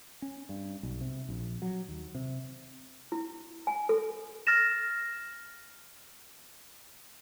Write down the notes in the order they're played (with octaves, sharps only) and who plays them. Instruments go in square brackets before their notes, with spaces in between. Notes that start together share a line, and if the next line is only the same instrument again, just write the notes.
[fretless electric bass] C#4
G2
B1
C3
A#1
F#3
D#2
C3
[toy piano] E4
G#5
A4
[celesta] F6 A6 A#6 E7